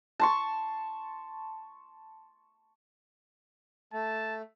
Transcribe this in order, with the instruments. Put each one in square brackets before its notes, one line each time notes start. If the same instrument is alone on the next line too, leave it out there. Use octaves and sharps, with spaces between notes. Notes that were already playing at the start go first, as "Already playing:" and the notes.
[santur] A5 C6 C#6
[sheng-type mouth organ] A3 [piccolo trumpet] A5